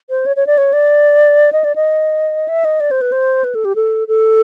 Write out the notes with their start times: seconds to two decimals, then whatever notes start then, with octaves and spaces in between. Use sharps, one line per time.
0.10 C5
0.26 C#5
0.36 C#5
0.47 D5
0.58 C#5
0.73 D5
1.53 D#5
1.64 D5
1.76 D#5
2.48 E5
2.65 D#5
2.80 D5
2.91 C5
3.01 B4
3.12 C5
3.44 B4
3.55 A4
3.65 G4
3.76 A4
4.08 A4